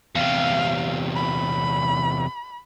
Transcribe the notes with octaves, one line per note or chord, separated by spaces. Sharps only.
E2 C3 F5
B5